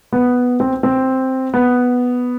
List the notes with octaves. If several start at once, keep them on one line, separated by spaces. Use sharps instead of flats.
B3
C4
C4
B3